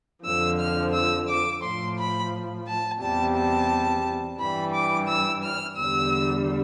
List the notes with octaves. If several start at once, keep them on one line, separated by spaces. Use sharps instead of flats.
F2 D3 F3 E6
F6
E6
D6
A2 F3 C6
B5
A5
E2 C3 G3 A5
A5
G2 E3 G3 B5
D6
E6
F6
E2 D3 G3 E6